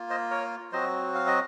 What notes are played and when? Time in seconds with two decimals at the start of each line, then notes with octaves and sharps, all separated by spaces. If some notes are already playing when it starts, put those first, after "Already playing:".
Already playing: A#3 F4
0.10 C5 D#5
0.31 A#4 C#5
0.72 F#3 C4 F#4 C5 D#5
1.15 F5
1.27 D#5